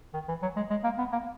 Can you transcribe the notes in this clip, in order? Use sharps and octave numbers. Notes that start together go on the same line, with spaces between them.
D#3
E3
F#3
G#3
G#3
A#3
B3
A#3